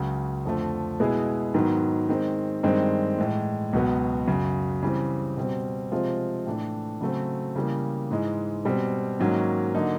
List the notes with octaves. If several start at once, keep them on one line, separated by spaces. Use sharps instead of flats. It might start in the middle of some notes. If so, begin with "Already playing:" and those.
Already playing: C#2 C#3 F#3
F2 D3 F3 A3
B2 G#3 B3 E4 G#4
G#2 D#3 F#3 B3
D#3 G#3 C4
G2 D#3 G#3 C4
A2 E3 G#3
C#2 B2 F#3 B3
F#2 C#3 F#3
C#3 E3 G3 C4
B2 G3 C4
C3 F3 G#3 C4 F4
A2 E3 A3 D4
C#3 F#3 A3 C4
C#3 E3 G3 A#3
G#2 E3 G#3
B2 G3 C4
G#2 D#3 F#3 A#3 C#4
D3 F#3 A#3 D#4